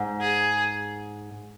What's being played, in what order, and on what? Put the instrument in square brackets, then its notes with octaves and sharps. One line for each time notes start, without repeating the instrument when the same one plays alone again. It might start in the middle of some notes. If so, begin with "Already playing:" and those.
Already playing: [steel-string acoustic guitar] G#2
[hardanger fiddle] G#4